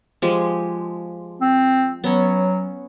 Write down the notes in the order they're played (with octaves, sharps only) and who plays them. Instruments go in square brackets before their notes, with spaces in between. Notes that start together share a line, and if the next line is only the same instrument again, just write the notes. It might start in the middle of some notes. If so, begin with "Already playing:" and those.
[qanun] F3 G#3 G4
[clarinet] C4
[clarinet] F#3 [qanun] B3 C#4